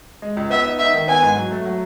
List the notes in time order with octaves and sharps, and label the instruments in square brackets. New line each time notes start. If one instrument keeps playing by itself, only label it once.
[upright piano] G#3
C#2
[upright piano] B3 [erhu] E5
[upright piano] D#4
[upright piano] D#4 [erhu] E5
[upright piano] D#3
[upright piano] B3 [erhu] G#5
[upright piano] G#2
F#3
A3
F#3